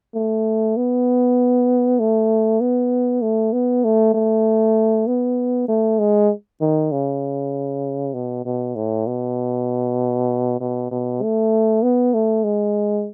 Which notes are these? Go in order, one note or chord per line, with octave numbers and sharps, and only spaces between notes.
A3
B3
A3
B3
A3
B3
A3
A3
B3
A3
G#3
D#3
C#3
B2
B2
A2
B2
B2
B2
A3
B3
A3
G#3